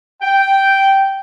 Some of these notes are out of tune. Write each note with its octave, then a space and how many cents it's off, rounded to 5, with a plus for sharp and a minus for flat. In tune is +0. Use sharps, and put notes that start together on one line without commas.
G5 -5